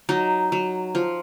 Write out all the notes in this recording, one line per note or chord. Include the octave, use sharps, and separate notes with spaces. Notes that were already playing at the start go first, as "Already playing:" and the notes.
F#3 D#4
F#3
F3